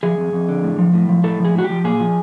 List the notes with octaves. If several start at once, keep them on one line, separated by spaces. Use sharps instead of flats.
F3 G#4
F2
F2
D3
A2
F3
A2
F3
A2 A4
F3 G#4
A2 F#4
G4
F3
A#2 G#4
F3